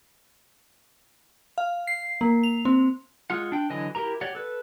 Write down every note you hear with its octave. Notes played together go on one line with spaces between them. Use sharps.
F5
C7
A#3
F7
C4
G#3 F4 F#5
D4 G5
D3 E3 F#3 D#5 G#5
E4 G4 A#4 A#5
G4 C#5 D5 F#5
A4 B4